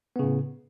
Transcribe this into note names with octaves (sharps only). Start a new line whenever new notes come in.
A2 C#3 B3